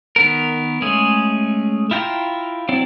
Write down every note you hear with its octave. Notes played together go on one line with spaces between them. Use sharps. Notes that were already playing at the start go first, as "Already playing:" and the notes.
D#3 B3 A#4
G#3 A3 C#4 G#4
E4 F4 G5 A#5 C6
F#3 C4 E4 D5